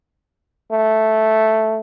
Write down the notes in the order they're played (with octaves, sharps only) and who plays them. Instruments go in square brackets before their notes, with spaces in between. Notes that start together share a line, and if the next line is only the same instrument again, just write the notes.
[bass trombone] A3